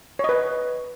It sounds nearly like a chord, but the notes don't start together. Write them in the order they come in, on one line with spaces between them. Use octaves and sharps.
C#5 D#5 B4